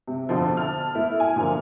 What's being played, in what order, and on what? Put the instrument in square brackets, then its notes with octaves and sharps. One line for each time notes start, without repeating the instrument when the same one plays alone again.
[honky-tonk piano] C3
F2 B2 D3 F3
A5 F6
A3 B3 E4
E5 G#5
A#2 D3 F3 A#4 F6